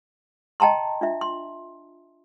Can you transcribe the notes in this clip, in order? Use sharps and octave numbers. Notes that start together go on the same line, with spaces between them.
D#5 G5 A5 A#5 C6
D4 F4 E5
C6